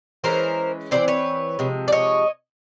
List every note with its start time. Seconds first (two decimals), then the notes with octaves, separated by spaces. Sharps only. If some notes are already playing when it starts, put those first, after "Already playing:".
0.24 E3 G#3 C#4 A#4 C5
0.91 E3 G3 C4 C5 D5
1.08 B4 C#5
1.59 C3 F3 G#3
1.88 D5
1.92 C#5 D#5